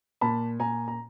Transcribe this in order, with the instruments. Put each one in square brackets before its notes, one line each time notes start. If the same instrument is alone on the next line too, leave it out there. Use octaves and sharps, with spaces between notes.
[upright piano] A#2 A5 B5
A#2 G#5 A#5
A#5